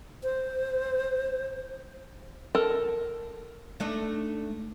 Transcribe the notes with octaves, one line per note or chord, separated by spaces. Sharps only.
C5
A4 A#4 A5
A3 D4 D#4